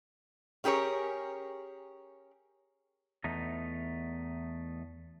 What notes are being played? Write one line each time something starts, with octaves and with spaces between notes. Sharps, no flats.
C#4 G4 G#4 A#4 C#5
E2 A3 D#4